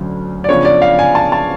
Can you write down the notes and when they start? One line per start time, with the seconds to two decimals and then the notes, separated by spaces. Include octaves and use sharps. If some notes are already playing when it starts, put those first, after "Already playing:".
Already playing: D2 D3 F#3 C#4
0.44 D5
0.49 C#3 F3 B3 D4 C#5
0.65 D5
0.82 F5
0.99 G#5
1.15 A5
1.32 A5